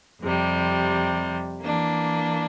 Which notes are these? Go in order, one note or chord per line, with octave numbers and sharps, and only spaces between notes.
F2 C3 G3
E3 A#3 D4